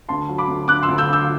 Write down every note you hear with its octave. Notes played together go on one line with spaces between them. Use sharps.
D2 A5 C6
F#3
B5 D6
D2
D3 D6 F#6
C6 E6
D2
E6 G6
D3 E6 G6